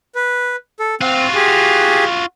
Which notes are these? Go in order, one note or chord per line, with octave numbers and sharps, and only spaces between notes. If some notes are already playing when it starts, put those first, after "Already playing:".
B4
A4
C4 F4 F#4
G4 G#4